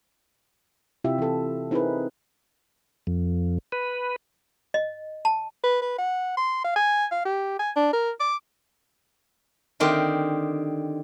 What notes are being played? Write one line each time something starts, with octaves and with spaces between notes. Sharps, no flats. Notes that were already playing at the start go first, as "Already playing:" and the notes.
C3 E4 F4 G4 E5
E3 A4
C4 D#4 E4 G#4 A#4 B4
F2
B4
D#5
A5
B4
B4
F#5
C6
F5
G#5
F5
G4
G#5
D4
A#4
D6
D3 D#3 C4 G4